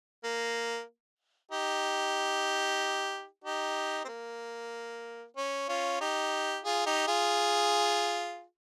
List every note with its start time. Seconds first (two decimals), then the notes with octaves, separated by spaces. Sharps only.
0.24 A#3
1.52 D#4 G4
3.44 D#4 G4
4.05 C4
4.08 A#3
5.37 C#4
5.69 C#4 F4
6.01 D#4 G4
6.65 F4 G#4
6.86 D#4 G4
7.08 F4 G#4